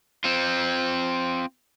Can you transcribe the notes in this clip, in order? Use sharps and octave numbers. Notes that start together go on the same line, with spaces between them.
C4 F4